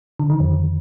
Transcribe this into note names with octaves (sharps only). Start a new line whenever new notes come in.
D3
D#3
F2